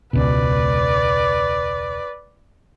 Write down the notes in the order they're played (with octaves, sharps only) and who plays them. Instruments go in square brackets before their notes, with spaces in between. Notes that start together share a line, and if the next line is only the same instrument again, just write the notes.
[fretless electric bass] E1 C#2 B2 [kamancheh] B4 D5